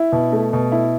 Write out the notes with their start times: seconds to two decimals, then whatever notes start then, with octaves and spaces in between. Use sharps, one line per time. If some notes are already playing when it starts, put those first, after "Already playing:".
Already playing: E4
0.12 B2
0.32 A3
0.53 B2
0.72 E4